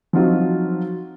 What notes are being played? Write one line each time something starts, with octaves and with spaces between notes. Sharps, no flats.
F3 F#3 C4 D#4 F4 F#4